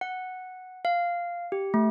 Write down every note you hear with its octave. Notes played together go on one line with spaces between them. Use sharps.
F#5
F5
G4
A3